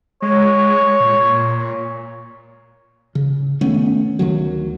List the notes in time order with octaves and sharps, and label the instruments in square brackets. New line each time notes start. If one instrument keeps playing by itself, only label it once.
[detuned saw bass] G#3 [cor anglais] C#5
[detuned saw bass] A#2
[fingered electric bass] C#3
D#3 A3 B3 C#4
D2 D#3 F#3